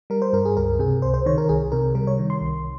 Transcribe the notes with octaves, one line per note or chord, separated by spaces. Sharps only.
G3 A#4
C5
G2 A#4
G#4
C#2 A#4
C3 G#4
C#2 C5
C5
D#3 C#5
A#4
C2 G#4
C3 A#4
G3 A#4
C#5
D#3
C6
C2